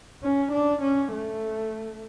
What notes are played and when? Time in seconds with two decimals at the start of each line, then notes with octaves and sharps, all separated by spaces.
0.23 C#4
0.52 D4
0.82 C#4
1.12 A3